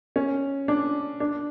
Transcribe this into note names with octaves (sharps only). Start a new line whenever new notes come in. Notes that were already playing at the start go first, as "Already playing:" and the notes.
C#4
D4
D4